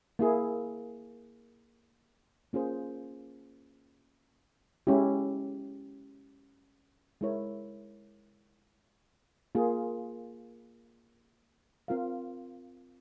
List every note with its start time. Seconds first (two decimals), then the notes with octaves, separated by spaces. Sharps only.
0.19 A#3 E4 G#4
2.53 A#3 C#4 F4 G#4 C5
4.87 G#3 C#4 E4 G4
7.21 G#3 E4 A#4 C#5
9.55 A#3 F4 G#4
11.88 C4 F4 A#4 F5